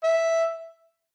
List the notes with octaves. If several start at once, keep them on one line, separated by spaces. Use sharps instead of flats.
E5